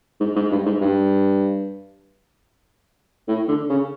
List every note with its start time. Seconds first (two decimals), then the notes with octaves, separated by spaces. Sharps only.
0.20 G#2
0.36 G#2
0.51 G2
0.66 G#2
0.81 G2
3.28 A2
3.48 D3
3.69 C#3